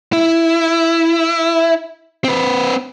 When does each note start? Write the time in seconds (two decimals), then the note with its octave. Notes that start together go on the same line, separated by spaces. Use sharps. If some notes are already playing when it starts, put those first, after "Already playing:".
0.13 E4
2.24 C4 B4